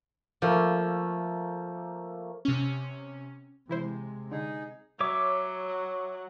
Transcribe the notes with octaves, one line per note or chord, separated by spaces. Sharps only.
F3 A3 A#3
C3 C#4
C3 E3 G#3 E4 C5
D3 D#4 G#4
F#3 C#5 E5 D6